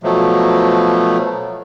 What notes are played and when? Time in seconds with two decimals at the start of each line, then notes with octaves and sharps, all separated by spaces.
0.03 B2 F3 F#3 A3